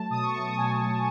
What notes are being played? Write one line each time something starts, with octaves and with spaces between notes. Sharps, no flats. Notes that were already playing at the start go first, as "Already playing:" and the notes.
Already playing: F#3 A3 A5
B2 D#6
C#6
F#3 A3 C#6
D#6
B2 G#5
F#3 A3